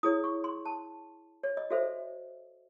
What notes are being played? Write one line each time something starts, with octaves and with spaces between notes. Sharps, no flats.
E4 G#4 C#5 D#6
C#6
C6
A5
C#5
D#5
F#4 A4 C5 E5